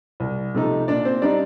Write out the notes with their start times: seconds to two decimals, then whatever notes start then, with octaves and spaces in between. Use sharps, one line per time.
0.20 C2
0.54 C3 F3 A3 D#4
0.88 A#2 D4 D5
1.05 C4 C5
1.22 G3 C4 D4 D#4 D5